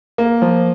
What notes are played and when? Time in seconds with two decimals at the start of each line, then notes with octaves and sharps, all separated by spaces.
0.18 A#3
0.42 F3